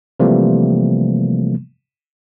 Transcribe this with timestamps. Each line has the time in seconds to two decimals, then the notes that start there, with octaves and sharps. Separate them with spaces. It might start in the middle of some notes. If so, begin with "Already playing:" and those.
0.20 C3 E3 F3 G3 A3 A#3